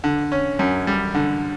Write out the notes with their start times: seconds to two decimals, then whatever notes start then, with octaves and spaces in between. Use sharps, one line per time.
0.04 D3
0.32 C#4
0.59 F#2
0.87 G3
1.15 D3